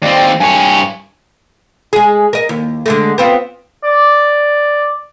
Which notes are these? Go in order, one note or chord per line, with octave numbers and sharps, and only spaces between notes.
D#2 C4 D5
G2 C#5 G#5
G#3 G#4
A#4 D#5
D#2
D3 G#3 A3
B3 C4 F4
D5